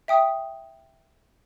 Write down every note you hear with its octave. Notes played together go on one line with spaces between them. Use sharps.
E5 G5 D#6